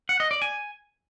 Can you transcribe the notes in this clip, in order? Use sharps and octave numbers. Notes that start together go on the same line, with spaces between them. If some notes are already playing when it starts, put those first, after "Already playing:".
F#5
D#5
D5
G#5